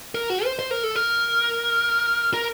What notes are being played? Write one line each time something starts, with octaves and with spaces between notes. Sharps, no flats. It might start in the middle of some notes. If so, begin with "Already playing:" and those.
A#4
F#4
C5
C5
A#4
A4
A#4
A#4